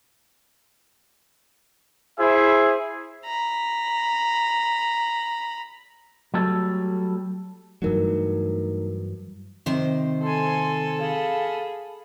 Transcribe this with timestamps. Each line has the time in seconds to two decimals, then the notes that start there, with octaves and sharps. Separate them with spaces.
2.18 E4 G#4 C5 E5
3.25 A#5 B5
6.34 F#3 G3 A3 A4
7.82 G2 E3 F#3 A3 D#4 A#4
9.66 C3 D#3 C5
10.23 A4 G#5 C6
11.01 G#4 F5 B5